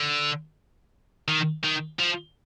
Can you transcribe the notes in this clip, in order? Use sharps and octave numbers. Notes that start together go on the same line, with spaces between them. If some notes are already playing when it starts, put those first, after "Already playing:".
Already playing: D3
D#3
D#3
F3